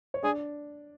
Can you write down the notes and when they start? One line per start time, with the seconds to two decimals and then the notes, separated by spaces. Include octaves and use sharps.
0.14 C#5
0.23 D4 G#4 D5